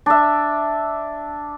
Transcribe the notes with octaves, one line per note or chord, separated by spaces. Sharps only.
D4 E5